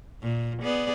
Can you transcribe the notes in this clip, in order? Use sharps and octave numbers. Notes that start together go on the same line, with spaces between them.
A#2
B3 G#4 D5